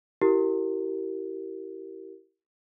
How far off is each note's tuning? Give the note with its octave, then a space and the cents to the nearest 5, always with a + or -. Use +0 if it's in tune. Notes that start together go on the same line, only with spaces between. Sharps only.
E4 +0 G4 -30 A#4 -10